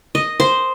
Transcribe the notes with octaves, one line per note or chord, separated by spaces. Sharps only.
D#5
C5